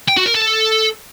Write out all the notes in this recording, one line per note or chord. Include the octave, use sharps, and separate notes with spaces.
G5
F#4
A#4
A4